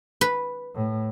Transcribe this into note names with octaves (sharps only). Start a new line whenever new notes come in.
B4
A2